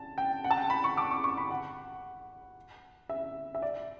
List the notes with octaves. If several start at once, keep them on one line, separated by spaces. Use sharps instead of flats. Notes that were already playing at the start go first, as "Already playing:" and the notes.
Already playing: A5
G5
F#5
A5
G5
B5
C#6
D6
C#6
C#6
B5
F#5
E5
E5
D5